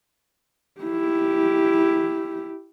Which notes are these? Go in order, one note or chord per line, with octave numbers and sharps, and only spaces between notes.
E4 G4